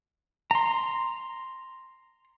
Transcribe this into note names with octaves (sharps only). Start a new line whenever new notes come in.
A#5 C6